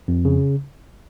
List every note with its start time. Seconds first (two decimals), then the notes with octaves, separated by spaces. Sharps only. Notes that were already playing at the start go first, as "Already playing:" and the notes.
0.08 F2
0.25 C#3